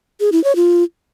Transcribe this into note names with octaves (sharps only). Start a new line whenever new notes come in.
G#4
E4
C#5
F4